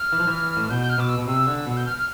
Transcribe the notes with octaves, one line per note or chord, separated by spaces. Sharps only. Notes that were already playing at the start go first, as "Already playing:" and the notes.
Already playing: F6
E3
F3
E3
A2
B2 G6
G6
F6
B2 D6
E6
B2
C3 E6
D3
B2
G6
F6
F6